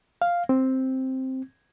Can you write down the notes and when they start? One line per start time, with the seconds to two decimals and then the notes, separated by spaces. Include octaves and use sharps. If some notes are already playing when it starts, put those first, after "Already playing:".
0.22 F5
0.49 C4